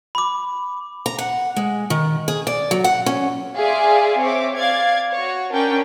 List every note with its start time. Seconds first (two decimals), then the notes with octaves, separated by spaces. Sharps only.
0.15 B5 D6
1.06 A#5
1.18 F#5
1.56 G#3
1.90 D#3
2.28 G#4
2.47 D5
2.71 F#3
2.84 F#5
3.06 C#4
3.57 G#4 D5 E5 F5 G#5 C6
4.19 C4 C#5 E5 D6
4.57 D5 F5 G#6 A6
5.14 F#4 C#5
5.53 C#4 D4 A#4 G5